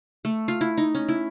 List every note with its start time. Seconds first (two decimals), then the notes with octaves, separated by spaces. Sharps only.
0.25 A3
0.48 F4
0.61 E4
0.77 D#4
0.95 C#4
1.08 E4